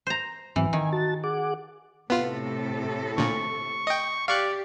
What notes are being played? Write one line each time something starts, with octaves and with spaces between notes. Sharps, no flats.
C5 A#5
G#2 E3 F#3 C4
D#3 G#5
F#4 A5 A6
G#4 F#5 D6
A2 C3 B3 F4 A4
A#2 D3 C#6
D#5 G5
G4 D5 F5 C#6 F#6